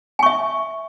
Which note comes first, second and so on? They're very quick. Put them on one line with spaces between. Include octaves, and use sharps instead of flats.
G#5 C#6 E5